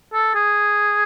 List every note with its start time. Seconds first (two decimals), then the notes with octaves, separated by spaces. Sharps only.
0.13 A4
0.35 G#4